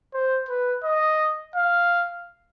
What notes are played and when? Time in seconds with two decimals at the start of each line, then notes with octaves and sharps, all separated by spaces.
0.14 C5
0.49 B4
0.84 D#5
1.55 F5